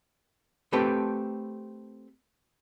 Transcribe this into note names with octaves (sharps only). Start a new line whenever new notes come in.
A3 C4 G4 A4 B4